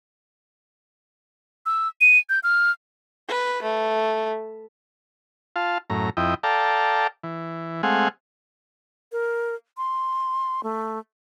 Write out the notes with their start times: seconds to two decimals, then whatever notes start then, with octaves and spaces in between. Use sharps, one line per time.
1.66 E6
2.01 D#7
2.29 G6
2.43 F6
3.28 B4
3.63 A3
5.56 F4 F5 A5
5.90 F#2 A2 A#5
6.17 F2 E4 D#5 G5
6.43 A4 D5 F5 G5 A5 A#5
7.23 E3
7.83 G#3 A3 C4 F5 F#5 G#5
9.12 A#4
9.77 C6
10.63 A3